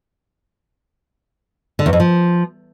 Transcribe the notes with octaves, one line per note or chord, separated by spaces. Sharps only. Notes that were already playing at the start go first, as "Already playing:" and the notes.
D3
E2
F2
F3